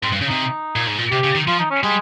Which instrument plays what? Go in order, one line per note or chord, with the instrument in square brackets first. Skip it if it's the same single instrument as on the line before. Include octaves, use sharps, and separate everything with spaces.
[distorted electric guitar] G#2 [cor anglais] C4
[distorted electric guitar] G2
C#3
[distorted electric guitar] C3 [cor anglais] D#4
[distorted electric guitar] A#2
G#2
A#2
[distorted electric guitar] C3 [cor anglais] G4
[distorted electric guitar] C#3
D#3
[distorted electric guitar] F3 [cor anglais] F4
[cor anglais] D#4
C#4
[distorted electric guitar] G3 [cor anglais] G#3